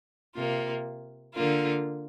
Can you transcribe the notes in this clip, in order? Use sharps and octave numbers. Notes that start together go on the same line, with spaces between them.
C3 A#3 F4
D3 A#3 F4